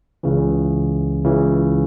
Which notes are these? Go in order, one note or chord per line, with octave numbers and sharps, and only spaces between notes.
C#2 C#3 E3
C#2 C#3 E3